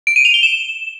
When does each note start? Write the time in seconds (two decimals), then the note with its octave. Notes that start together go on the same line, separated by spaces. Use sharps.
0.07 D7
0.16 D#7
0.25 F7
0.34 G7
0.43 E7